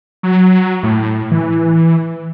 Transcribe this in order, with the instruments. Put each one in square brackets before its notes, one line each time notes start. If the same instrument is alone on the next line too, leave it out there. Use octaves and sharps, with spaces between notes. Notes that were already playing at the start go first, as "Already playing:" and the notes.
[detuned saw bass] F#3
A2
E3